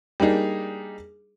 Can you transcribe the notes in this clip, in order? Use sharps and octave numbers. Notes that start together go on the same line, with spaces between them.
G3 A#3 D4 D#4 G#4